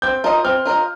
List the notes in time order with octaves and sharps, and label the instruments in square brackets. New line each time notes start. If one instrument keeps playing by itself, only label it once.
[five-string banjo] C4 [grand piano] G6
[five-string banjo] F4 A#4 D#5
[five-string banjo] C4 [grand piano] F6
[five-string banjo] F4 A#4 D#5